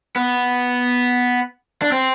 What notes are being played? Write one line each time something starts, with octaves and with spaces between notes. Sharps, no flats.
B3
D4
C4